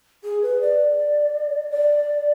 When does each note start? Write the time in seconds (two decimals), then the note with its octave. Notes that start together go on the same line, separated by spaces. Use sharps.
0.24 G#4
0.42 B4
0.61 D5
1.71 D5